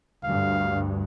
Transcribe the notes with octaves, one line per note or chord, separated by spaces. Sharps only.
D2 G2 F5